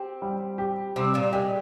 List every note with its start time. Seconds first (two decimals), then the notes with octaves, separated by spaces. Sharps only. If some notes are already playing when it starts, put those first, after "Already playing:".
Already playing: C4 G4
0.22 G3
0.58 G4
0.96 C3 G3 C4
1.14 A#2 A#3
1.33 G#3 G4